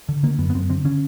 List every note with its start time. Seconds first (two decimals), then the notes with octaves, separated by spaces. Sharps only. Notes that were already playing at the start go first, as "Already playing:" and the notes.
0.09 D3
0.23 D3 A#3
0.39 F#2 B3
0.50 B3
0.55 F#2 C4
0.69 D3 C4
0.85 D3 C#4